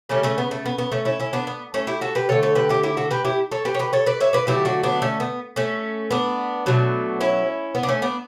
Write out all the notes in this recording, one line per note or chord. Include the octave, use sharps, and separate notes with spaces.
C#3 G3 A3 C#4
A3 C#4
B3
A3
B3
B3
A3 C#4
C#4 E4
C#4 E4
B3 D4
B3
A3 C#4
E4 G4
F#4 A4
G4 B4
D3 A3 A4 C#5
A4 C#5
G4 B4
E4 G4
E4 G4
F#4 A4
G4 B4
E4 G4
A4 C#5
G4 B4
C#5
G4 B4
A4 C#5
B4 D5
C#5 E5
B4 D5
D3 F#3 A3 E4 G4
D4 F#4
B3 D4
A3 C#4
B3
A3 C#4
B3 D4
B2 F#3 A3
C#4 E4
B3
D4
A3 C#4
B3 D4